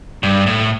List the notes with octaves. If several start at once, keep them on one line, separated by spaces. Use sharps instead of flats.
G2
A2